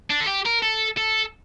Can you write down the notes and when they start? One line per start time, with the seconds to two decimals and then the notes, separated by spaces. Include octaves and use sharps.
0.10 D4
0.20 A4
0.27 G4
0.45 A#4
0.62 A4
0.98 A4